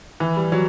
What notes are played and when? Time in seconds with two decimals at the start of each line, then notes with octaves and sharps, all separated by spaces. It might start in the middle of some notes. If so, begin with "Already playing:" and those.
0.20 E3
0.37 G3
0.52 F#3